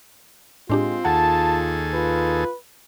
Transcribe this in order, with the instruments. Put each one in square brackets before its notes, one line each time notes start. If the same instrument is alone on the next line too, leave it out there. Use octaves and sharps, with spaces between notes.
[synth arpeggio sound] A2 D4 G4 [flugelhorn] G#3 [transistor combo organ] C4 [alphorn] F4
[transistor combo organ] D#2 G#4 A4 [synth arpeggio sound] F#5 [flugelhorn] A5
[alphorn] F4 [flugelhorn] B4